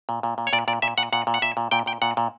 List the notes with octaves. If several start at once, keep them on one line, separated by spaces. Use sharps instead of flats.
A#2
A#2
A#2
C#5
A#2 D5
A#2 D5
A#2 E5
A#2 F#5
A#2 F#5
A#2
F#5
A#2 E5
A#2
A#2 G5
A#2 G5
A#2 F#5
A#2